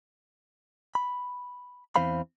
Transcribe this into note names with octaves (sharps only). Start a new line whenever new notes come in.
B5
E2 E3 C4 C5 F5 B5